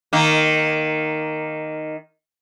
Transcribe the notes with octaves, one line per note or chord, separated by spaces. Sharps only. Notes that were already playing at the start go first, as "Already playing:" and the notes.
D#3 A#3